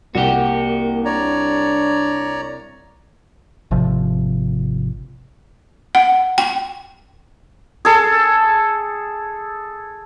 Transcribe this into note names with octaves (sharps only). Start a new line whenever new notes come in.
C2 A#3 F#4 G4
D4 C#5 D5 A#5
G#1 C3 F3
F#5
G5
G#4 A4